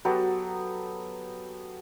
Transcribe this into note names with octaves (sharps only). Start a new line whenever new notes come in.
F#3 B3 G4 A4